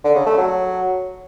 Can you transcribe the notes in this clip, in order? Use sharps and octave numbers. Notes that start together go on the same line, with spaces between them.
D3
C#3
A3
F#3